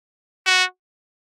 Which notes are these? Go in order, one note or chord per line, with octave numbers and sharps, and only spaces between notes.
F#4